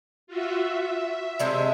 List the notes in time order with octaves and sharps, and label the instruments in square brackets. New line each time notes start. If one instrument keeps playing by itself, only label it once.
[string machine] F4 F#4 E5
E5
[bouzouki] C3 G#3 D4